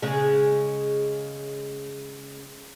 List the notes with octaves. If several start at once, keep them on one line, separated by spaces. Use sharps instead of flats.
C#3 G#3